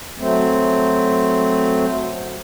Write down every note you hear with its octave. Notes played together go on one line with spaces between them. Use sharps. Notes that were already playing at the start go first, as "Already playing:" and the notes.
F#3 A3 C4